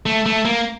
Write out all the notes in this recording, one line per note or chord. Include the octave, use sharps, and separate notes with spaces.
A3
A3
A#3